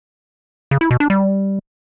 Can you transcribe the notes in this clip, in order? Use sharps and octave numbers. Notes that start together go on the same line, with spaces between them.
C#3
E4
B2
D4
G3